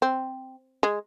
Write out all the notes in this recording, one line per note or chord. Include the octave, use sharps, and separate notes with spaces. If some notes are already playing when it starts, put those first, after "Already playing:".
C4
G#3